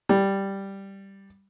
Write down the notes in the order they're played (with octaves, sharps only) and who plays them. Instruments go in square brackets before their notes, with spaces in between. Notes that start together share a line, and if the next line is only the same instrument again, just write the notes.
[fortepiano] G3